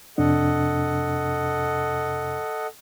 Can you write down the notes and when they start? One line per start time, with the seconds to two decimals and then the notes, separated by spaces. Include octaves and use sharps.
0.18 F2 C3 D4 A4 D#5 F#5